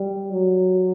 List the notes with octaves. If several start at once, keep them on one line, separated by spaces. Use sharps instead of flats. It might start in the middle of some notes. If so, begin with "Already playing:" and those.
Already playing: G3
F#3